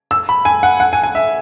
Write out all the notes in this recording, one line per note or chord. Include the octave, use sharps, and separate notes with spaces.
E6
B5
G#5
F#5
F#5
G#5
G#5
E5